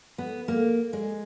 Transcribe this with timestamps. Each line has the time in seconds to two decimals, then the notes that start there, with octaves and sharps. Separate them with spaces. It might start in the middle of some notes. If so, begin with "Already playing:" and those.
0.18 B3
0.48 A#3
0.93 G#3